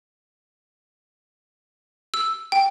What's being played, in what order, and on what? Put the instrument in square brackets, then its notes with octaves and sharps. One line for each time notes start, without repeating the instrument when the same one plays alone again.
[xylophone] E6
G5